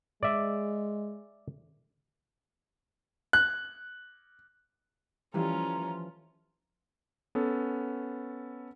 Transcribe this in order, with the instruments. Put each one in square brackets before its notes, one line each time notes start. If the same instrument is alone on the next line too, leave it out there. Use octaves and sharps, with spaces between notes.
[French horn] G#3 [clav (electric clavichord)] D5 E5
[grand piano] F#6
[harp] E3 F3 A3 [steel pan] G3 E4 [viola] C#4 F4 [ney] A#5
[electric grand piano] B3 C#4 A4